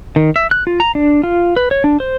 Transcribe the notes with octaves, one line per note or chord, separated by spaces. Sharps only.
D#3
E5
F#6
F4
A#5
D4
F4
B4
C#5
D4
C5